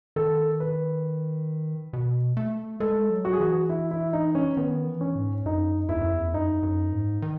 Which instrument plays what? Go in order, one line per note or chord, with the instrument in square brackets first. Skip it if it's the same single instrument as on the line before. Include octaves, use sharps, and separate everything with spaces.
[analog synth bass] D#3 [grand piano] A4
[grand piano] B4
[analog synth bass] B2
A3
[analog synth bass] G#3 [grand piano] A4
[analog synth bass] F#3
[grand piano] F#4
G#4
[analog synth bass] E3 [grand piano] F#4
[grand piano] E4
E4
D#4
C#4
[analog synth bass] D#3 [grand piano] B3
[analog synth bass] E3
[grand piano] C#4
[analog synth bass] G#2
[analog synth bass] F#2 [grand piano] D#4
[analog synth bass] E2 [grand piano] E4
[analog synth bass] F#2
E2
[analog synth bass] F#2 [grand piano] D#4
[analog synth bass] F#2
G#2
D#3